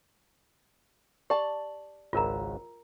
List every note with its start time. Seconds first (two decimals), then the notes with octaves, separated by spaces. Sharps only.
1.30 G4 D5 A5
2.13 G#1 C#2 G#2 F4 A#4 A#5